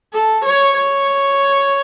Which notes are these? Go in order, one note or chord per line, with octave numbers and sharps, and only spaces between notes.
A4
C#5
C#5